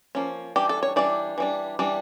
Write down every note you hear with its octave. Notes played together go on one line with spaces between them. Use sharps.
F3 A#3 C#4
E3 G3 D4 G4
A4
C#5
E3 G3 D4 D5
E3 G3 D4
E3 G3 D4